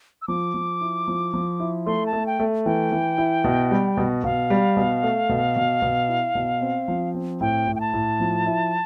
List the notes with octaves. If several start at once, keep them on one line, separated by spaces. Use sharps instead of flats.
E6
F3 D6
F3
E4
F3
F3
E4
A3 C6
A5
A3
G5
A3
E3 G5
E3
E4
B2
G3
B2
B2 F5
G3
B2
A3
B2
B2
B2
E4
B2
C4
F3
C4
A2 G5
A2
G5
A5
A2
F3
E4